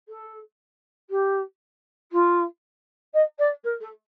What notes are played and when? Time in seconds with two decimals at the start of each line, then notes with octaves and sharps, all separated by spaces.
0.08 A4
1.10 G4
2.12 F4
3.13 D#5
3.39 D5
3.64 A#4
3.80 A4